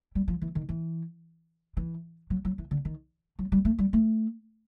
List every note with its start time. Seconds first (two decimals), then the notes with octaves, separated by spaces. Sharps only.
0.15 G3
0.28 F3
0.42 E3
0.55 D#3
0.69 E3
1.77 E3
2.30 F#3
2.45 F#3
2.58 E3
2.71 D3
2.85 D#3
3.39 F#3
3.52 G3
3.65 A3
3.79 G3
3.93 A3